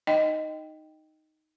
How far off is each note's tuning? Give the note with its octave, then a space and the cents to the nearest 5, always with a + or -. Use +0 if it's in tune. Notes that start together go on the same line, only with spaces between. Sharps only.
D#4 +0 D#5 +0 G5 +0